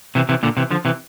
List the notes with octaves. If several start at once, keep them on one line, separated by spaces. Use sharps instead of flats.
C3 E3
C3 E3
A#2 D3
C3 E3
D3 F3
C3 E3